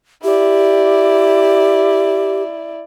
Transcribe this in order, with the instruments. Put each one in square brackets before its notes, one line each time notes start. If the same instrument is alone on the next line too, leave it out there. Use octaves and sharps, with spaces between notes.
[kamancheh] E4 D5 [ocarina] G4